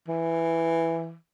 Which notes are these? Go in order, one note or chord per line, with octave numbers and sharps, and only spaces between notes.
E3